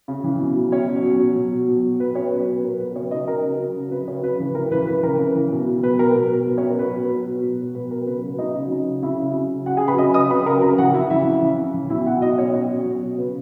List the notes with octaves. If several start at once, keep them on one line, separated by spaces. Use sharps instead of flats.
C#3
E3
B2
F#3
B2 C#4 C#5
F#3
B2
F#3
B2
F#3
B2
F#3
B2 B4
F#3 C#4 C#5
B2 B4
F#3
B2 A#4
F#3 B4
C#3 C#4 C#5
F#3 D#4 D#5
C#3 A#4
F#3
C#3
F#3
C#3 B4
F#3 C#4 C#5
C#3 B4
E3
C#3 A#4
E3 B4
C#3 B4
E3 A#4
C#3
E3
B2
F#3
B2 B4
F#3 A#4
B2
F#3
B2 B4
C#4 C#5
F#3
A#4
B2 B4
F#3
B2
F#3
B2
F#3
B2 B4
F#3 A#4
C#3 B4
F#3
C#3 D#4 D#5
F#3
C#3
F#3
C#3 E4 E5
F#3
C#3
F#3
C#3 F#4 F#5
G#4 G#5
F#3
B4 B5
C#3 D#5 D#6
F#3 D#5 D#6
C#3 B4 B5
F#3 A#4 A#5
C#3 A#4 A#5
E3 F#4 F#5
C#3 E4 E5
E3 E4 E5
C#3
E3
C#3
E3
B2 E4 E5
F#3 F#4 F#5
B2 D#4 D#5
F#3 C#4 C#5
B2 C#4 C#5
F#3
B2
F#3
C#3 B4